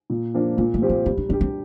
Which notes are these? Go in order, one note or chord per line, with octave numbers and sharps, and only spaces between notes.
A#2
F3 A#3 D4
A#2 A#3
A3
F3 C4 G4
A#3
G3 C4
D4
C4 D4 G4
C4